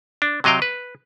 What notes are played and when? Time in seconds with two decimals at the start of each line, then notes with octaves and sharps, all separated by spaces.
0.22 D4
0.44 C3 F#3 D#5 F5 G5
0.62 B4